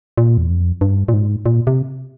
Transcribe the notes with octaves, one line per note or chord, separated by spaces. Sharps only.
A#2
E2
F2
G2
A#2
G#2
A#2
C3